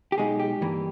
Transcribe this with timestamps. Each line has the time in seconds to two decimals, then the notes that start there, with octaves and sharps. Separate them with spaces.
0.12 G4
0.18 B1 B2 G#3 D#4 G#4
0.39 G4
0.61 G2 E3 A#3